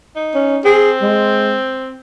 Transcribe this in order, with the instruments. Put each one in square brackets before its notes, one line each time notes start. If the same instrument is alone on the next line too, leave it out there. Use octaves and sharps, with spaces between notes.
[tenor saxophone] D#4
[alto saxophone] C#4
[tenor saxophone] C4 [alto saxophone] G#4
[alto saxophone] G#3